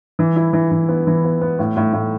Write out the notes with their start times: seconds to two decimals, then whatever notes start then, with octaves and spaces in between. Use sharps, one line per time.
0.19 E3
0.36 E4
0.53 E3
0.71 E3
0.89 B3
1.07 E3
1.24 B3
1.41 B3
1.59 A2
1.76 A2
1.93 A2